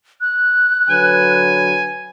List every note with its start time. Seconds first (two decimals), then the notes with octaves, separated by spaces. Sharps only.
0.21 F#6
0.90 D3 F#3 B4 G#5